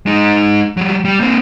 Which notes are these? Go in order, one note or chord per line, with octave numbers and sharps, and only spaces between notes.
G#3 D#4
F#3 G3
G3
A#3 C4